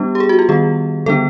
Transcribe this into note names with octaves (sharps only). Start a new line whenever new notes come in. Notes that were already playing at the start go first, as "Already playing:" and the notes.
Already playing: G3 B3 D4 G4
G4
G#4
F#4
F4
D#3 G3 B3 G#4
D3 G3 B3 D4 A4